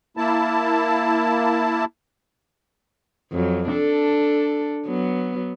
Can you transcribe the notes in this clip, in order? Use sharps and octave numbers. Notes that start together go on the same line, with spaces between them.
A#3 E4 A5
F2 F#3
D4 A4
F#3 B3